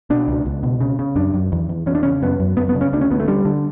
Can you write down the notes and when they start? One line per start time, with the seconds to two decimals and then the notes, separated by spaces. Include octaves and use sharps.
0.10 B2 D4
0.28 C#2
0.46 C#2
0.63 B2
0.80 C#3
0.99 C#3
1.16 F#2 D4
1.34 F#2
1.52 E2
1.69 E2
1.86 E2 C#4
1.95 D4
2.03 C#3 C#4
2.22 F#2 B3
2.40 F#2
2.57 F#2 B3
2.69 B3
2.75 C#3
2.81 C#4
2.93 D2 D4
3.01 C#4
3.11 D2 B3
3.20 A3
3.28 D3 G3
3.45 D3